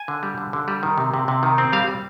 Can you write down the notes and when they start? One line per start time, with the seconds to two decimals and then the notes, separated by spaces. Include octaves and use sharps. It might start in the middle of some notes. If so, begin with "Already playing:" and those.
Already playing: G#5
0.08 D3
0.23 G3
0.38 D3
0.53 D3
0.68 G3
0.83 D#3
0.98 C3
1.14 C3
1.28 C3
1.43 D#3
1.58 C4
1.73 G3 F5
1.88 G3